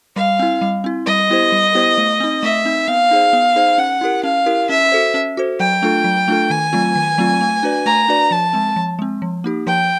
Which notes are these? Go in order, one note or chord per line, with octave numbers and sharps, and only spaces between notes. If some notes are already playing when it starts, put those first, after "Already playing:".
G3 F5
C4 E4
G3
C4 E4
G3 D#5
B3 E4 G4 C5
G3
B3 E4 G4 C5
A3
C4 D#4
A3 E5
C4 D#4
B3 F5
D#4 G#4 C5
B3
D#4 G#4 C5
C#4 F#5
E4 G4 A#4
C#4 F5
E4 G4 A#4
C#4 E5
F#4 A4 C5
C#4
F#4 A4 C5
F#3 G5
A3 D4 F4 A4
F#3
A3 D4 F4 A4
D#3 G#5
F#3 A3 C4 F4
D#3
F#3 A3 C4 F4
A3
D4 F#4 B4 D5
A3 A#5
D4 F#4 B4 D5
F3 A5
G#3 C4
F3
G#3 C4
F3
A#3 D#4 G4
F3 G5